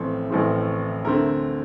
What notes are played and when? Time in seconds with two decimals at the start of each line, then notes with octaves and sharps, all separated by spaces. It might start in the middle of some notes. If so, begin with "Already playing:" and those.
Already playing: A1 A2 F3 A3 C4
0.30 A1 A2 F3 A3 C4
1.05 D2 D3 A3 C4 A#4